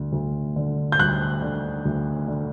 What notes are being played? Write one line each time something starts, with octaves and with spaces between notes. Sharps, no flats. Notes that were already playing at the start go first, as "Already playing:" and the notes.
Already playing: D2 D3
D2
D3
G6
D2 F#6
D3
D2
D3